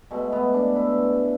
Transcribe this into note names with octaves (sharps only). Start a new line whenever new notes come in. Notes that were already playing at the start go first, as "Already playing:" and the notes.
B2 G#3 A3
B3
D4
E4